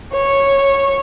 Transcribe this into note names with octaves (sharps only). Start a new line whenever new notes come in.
C#5